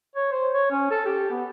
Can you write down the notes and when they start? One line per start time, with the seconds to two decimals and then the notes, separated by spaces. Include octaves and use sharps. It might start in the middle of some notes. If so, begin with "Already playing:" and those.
0.16 C#5
0.32 C5
0.54 C#5
0.71 C#4
0.91 A4
1.06 G4
1.31 B3